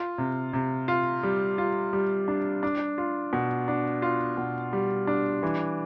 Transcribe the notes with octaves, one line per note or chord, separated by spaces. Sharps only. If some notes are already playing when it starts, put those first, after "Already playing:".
Already playing: F4
C3
C3
F4
G3
F4
G3
D4
D4
F4
B2
D4
F4
B2
G3
D4
E3